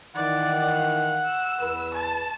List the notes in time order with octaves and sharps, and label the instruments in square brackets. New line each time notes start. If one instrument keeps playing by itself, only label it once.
[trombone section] D#3 E3 [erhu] D5 [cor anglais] F#5
[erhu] F5
E6
[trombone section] E2 B4
[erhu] A5